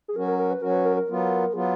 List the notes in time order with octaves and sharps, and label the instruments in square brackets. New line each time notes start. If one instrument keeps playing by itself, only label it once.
[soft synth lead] G#4
[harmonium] F#3 C#4 F#4 [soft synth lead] A#4
[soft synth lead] A#4
A#4
B4
[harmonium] F#3 C#4 F#4 [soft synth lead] A#4
[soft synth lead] B4
A#4
A#4
[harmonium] F#3 B3 F4
[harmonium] F#3 B3 F4 [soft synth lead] G#4